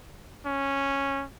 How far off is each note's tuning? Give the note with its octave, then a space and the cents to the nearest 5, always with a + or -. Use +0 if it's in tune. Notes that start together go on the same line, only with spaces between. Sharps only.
C#4 -10